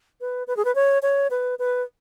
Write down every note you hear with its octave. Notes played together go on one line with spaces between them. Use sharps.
B4
B4
G#4
B4
C#5
C#5
B4
B4